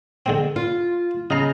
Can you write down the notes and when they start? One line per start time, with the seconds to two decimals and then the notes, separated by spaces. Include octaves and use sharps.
0.26 D3 G#3 C4
0.56 F4
1.30 C#3 D#5 A#5 C7